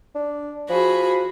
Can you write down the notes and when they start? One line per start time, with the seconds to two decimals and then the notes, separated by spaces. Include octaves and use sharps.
0.15 D4
0.70 F3 F#4 G#4 B5